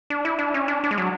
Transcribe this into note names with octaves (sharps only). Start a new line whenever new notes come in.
D4
E4
D4
C#4
D4
D4
G#3
F#3